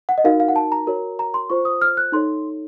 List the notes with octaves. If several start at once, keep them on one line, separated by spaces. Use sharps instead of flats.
F#5
D#5
D#4 F#4 A#4 F5
F5
F#5
A5
A#5
F#4 A#4 C#5
A#5
C6
F4 C5 C#6
D#6
F6
F#6
D#4 A4 C#5 C6